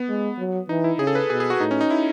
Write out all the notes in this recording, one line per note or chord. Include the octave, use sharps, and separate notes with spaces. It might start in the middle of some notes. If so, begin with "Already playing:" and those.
Already playing: B3
G#3
F#3
E3 D#4
E4
C#3 G#4
A4
B4
B2 G#4
G#4
F#4
A2 D#4
C#4
D#4
E4